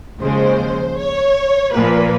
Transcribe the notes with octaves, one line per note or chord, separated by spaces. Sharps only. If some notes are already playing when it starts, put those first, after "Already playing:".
D#2 C#3 F3 G#3 C5
C#5
A#2 F3 A#3 B4